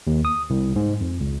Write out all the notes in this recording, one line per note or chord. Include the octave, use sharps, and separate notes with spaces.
D#2
D#6
C2
G#2
F2
C#2